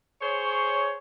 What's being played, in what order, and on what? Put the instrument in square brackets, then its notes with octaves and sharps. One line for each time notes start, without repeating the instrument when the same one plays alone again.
[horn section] G#4 C5 C#5